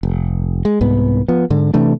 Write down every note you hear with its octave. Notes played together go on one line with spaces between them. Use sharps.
F1
G#3
C2 G#2 B3
F3 B3
G#2 D3
C3 E3 A3 D4